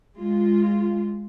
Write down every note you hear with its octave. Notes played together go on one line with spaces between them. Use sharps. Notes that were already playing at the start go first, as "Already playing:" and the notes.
G#3 F4